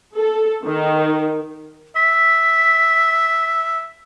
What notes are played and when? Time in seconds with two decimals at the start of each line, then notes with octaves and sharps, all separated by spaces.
0.16 A4
0.64 D#3
1.95 E5 B6